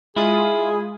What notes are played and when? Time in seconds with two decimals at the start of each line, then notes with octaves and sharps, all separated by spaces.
0.16 G#3 E4 F4 G#4 D#6